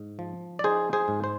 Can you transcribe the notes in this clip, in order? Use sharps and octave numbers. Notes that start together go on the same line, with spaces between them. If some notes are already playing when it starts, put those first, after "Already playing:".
Already playing: G#2
F3
D5
D#4 G#4 C5
G#4 C5
G#2
C5